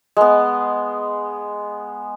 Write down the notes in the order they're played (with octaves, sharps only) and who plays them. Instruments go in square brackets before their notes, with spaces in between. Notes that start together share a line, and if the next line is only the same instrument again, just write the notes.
[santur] G#3 B3